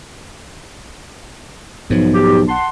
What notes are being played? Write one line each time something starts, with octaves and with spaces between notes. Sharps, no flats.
B1 G#2 F3
G4
F#5 A5 C6